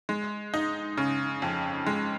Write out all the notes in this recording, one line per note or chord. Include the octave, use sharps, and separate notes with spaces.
G#3
D#4
C#3
F2
G#3